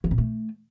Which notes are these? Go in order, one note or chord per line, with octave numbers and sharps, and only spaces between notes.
E3
A#2
A3